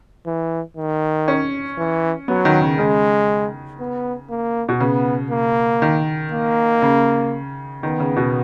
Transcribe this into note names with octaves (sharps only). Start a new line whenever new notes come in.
E3
D#3
C#4
E3
F#3 B3
D#3
C#3
C#3 G#3
B3
A#3
B2
C#3 B3
A#3
D#3
A#3
C#3
D#3 B3
C#3
B2